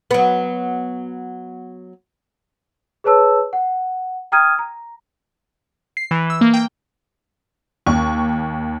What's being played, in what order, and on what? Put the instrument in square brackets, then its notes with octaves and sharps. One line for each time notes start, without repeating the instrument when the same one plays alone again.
[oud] F#3 B3
[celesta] G#4 B4 C#5 A5 E6
F#5
G5 A#5 D#6 F6 G#6 D#7
A#5
[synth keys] C7
E3
E6
A#3
G5
[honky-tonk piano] D#2 C#6